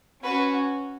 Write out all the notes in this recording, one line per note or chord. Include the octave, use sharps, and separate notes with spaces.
C#4 F#4 B4